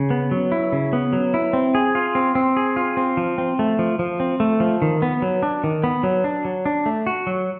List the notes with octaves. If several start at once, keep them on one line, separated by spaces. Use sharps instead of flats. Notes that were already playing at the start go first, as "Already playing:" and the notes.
Already playing: C#3
B3
F#3
E4
C#3
B3
F#3
E4
C4
G#4
F4
C4
C4
G#4
F4
C4
F3
C4
A3
F3
F3
C4
A3
F3
D#3
B3
F#3
D4
D#3
B3
F#3
D4
F#3
D4
A3
F#4
F#3